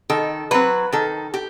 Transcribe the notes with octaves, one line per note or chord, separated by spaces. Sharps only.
D#3 A4
F#3 C4 B4
D#3 A4
G4